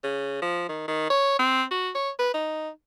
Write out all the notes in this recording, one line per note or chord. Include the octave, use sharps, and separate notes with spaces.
C#3
F3
D#3
D#3
C#5
C4
F#4
C#5
B4
D#4